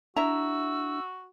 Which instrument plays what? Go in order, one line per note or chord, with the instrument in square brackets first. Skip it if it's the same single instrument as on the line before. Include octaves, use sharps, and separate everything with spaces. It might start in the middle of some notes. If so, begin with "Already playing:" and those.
[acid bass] D4 [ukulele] E4 E5 A#5 [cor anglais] F#4 [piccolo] E6